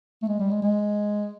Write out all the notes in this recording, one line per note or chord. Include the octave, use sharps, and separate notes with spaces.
A3
G#3
G3
G#3
G#3